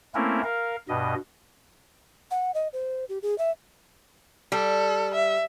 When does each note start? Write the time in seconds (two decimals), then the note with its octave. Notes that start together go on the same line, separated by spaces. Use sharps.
0.15 A3 A#3 C4 C#4 E4 A#4
0.44 A#4 F5
0.89 G2 B2 D#5
2.31 F#5
2.54 D#5
2.73 C5
3.09 G4
3.22 G#4
3.38 E5
4.52 G3 A4
5.15 E5